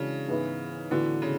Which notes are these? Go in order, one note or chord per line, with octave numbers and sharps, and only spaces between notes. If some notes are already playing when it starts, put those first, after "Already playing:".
Already playing: C#3 E3 G#3 D4 F#4
G#2 E3 B3 E4
A2 D3 E3 B3 F#4
C#3